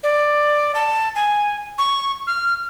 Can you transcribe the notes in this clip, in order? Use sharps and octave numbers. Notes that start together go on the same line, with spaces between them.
D5
A5
G#5
C#6
F6